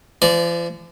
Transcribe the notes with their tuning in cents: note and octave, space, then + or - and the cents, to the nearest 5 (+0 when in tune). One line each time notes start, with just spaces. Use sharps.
F3 -45 D5 -5